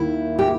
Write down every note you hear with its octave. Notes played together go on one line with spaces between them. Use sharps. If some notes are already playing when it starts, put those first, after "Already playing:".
Already playing: D#2 D#3 E4
G4